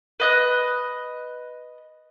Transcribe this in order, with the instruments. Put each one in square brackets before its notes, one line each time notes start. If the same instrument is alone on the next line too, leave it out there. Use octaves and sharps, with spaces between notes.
[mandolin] B4 D#5 F#6